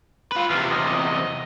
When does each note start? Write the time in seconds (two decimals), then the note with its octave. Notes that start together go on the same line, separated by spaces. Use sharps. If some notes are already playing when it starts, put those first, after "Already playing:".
0.32 F4 B4
0.50 E2 C3 F4
0.71 D#5